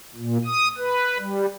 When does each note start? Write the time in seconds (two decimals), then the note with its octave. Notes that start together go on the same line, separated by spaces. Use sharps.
0.15 A#2
0.45 D#6
0.78 B4
1.18 G3